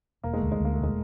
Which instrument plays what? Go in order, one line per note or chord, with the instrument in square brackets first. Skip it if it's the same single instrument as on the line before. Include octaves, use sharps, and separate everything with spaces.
[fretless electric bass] E1 [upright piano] A#3
[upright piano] G#3
[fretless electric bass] D2 [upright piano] A3
[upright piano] G#3
[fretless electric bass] D2 [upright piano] A#3
[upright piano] A3
[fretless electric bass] E1 [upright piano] G#3